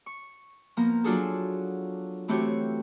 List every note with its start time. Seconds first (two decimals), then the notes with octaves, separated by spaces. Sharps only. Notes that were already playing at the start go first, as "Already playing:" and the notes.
0.06 C#6
0.77 F3 A#3 B3 A#5
1.04 F#3 D4 F4 F#4 G#4 A4
2.28 E3 A3 C4 F#4 G4 C#5